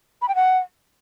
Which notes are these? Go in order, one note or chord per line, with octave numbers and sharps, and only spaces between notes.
B5
G5
F#5